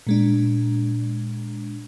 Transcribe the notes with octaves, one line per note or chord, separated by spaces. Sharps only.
A#2 G#3 D4